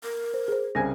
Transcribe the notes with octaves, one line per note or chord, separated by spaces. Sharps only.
A#4
C5
G#4 C5
C2 C#3 C5 G#5 G#6 A#6